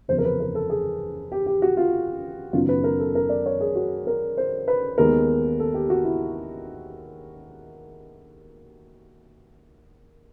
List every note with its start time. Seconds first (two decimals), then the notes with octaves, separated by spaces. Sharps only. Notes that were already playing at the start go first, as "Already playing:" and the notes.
0.08 F#1 E2 C3 F3 C5
0.18 A#4
0.25 B4
0.40 A#4
0.55 A4
0.70 G#4
1.32 G4
1.46 G4
1.62 F#4
1.77 F4
2.53 F#1 F#2 D#3 F#3 B3 F4
2.69 B4
2.84 A#4
3.00 A4
3.15 A#4
3.29 D5
3.46 C#5
3.60 G#4
3.75 F#4
4.07 A#4
4.37 C5
4.68 B4
4.98 D#2 D#3 G#3 B3 A#4
5.60 A4
5.74 G4
5.90 F#4
6.05 E4